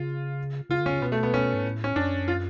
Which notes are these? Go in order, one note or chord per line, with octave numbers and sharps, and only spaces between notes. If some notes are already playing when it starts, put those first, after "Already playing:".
Already playing: C#3 F4
C#3 F4
D3
C#4
C#3
B2 B3
A3
B3
C#4
G#2
A2
C#4
F#2 D4
F4